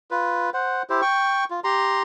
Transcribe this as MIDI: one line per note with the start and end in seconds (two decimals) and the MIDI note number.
0.11 0.50 65
0.11 0.50 71
0.54 0.83 72
0.54 0.83 78
0.90 1.01 64
0.90 1.01 67
0.90 1.01 72
1.02 1.44 79
1.02 1.44 85
1.50 1.60 65
1.64 2.03 67
1.64 2.03 82
1.64 2.03 84